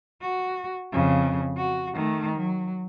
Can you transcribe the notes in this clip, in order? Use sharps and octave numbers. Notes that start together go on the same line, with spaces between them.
F#4
F2 C#3
F#4
D#3 A3
F#3